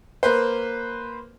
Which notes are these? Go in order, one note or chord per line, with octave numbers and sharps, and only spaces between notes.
A#3 B4 C5